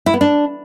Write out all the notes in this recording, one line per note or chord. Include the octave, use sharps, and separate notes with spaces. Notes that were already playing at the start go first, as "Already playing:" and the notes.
E4
B3
D4